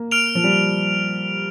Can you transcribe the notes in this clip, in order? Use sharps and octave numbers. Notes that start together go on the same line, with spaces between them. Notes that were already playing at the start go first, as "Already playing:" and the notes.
Already playing: A#3
F6 D7 F7
F3
G3